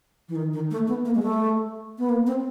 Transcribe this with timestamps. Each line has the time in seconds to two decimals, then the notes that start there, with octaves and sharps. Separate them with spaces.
0.29 E3
0.36 D#3
0.53 D#3
0.71 A3
0.88 B3
1.05 A#3
1.15 G#3
1.22 A3
1.98 B3
2.09 A#3
2.27 C4